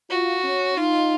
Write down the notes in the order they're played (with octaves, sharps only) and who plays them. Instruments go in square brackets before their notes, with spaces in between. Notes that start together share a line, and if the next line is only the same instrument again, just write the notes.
[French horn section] F4 [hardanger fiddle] F#4
[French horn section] C#4
[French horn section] D#4 [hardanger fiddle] F4